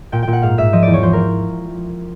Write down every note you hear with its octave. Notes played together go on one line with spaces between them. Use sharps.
A#2 G5
G5
A#2
F#5
G#2 F5
G#2 E5
F3 D#5
E2 D5
C#5
F3 C5
A#4